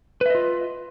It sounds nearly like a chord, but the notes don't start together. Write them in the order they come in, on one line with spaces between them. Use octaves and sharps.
B4 E5 D#5 F4